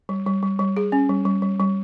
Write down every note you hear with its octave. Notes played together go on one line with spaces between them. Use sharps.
G3
G3
G3
G3
G#4
C#4
G3
G3
G3
G3